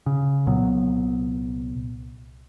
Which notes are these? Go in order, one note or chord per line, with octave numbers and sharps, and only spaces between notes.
C#3
C2 A#2 F#3 B3